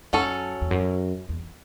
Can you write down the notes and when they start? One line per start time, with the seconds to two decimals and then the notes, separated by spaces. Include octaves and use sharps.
0.13 F#2 F#3 C#4 A4
0.61 E2
0.71 F#2
1.29 E2